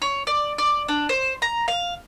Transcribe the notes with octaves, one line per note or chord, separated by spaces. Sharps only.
C#5
D5
D5
D4
C5
A#5
F5